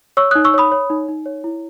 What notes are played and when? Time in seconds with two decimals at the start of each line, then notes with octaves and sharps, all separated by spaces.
0.17 C#5 C#6 E6
0.31 D#6 F#6
0.35 D#4
0.44 C#6 E6
0.54 C#5 B5 D#6
0.72 C#5
0.90 D#4
1.08 D#4
1.26 C#5
1.44 E4